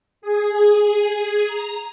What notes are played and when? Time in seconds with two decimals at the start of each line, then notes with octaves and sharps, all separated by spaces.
0.22 G#4
1.48 A#5